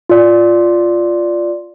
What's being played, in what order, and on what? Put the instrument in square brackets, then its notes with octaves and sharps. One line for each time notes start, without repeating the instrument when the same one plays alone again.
[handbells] F4 D5